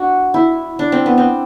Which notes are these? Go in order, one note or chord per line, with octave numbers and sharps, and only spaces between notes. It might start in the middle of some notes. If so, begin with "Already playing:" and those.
Already playing: D4 F#4
E4
D4
C4
B3
C4